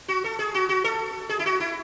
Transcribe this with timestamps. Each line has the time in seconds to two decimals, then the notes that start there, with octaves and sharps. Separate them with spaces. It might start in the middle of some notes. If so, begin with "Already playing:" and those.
0.08 F#4
0.24 A4
0.39 G#4
0.54 F#4
0.69 F#4
0.84 A4
1.29 G#4
1.39 E4
1.46 F#4
1.60 E4